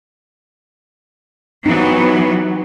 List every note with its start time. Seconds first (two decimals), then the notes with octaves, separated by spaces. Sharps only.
1.66 E3 F#3 B3 C4 D#4